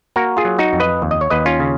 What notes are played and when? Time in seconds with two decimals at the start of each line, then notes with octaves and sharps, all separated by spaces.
0.16 A#3 F#4 A#4
0.37 F4 G#4
0.45 F#3
0.59 D#4 F#4
0.73 F2
0.80 B4 D#5
1.02 D#2
1.11 D#5
1.21 C#5
1.30 D#2 B4 D#5
1.46 C#4 F4
1.60 C#3